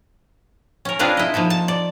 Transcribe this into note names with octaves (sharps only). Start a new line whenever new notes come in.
C#4 A#4
C4 D4 F4 G#4 A#4 B4
E4 D#5
F3 A#3 D#4 A4
A5
D5